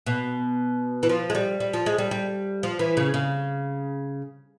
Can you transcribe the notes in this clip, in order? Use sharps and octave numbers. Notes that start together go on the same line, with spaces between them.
B2
E3
F3
G#3
G3
G3
F3
G#3
G3
G3
F3
E3
C#3
C#3